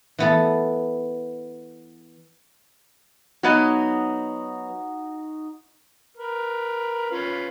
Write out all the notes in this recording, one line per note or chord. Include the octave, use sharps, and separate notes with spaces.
E3 B3 A4
F#3 B3 D#4 F#4 D#5
A#4 B4
C#4 F4 B4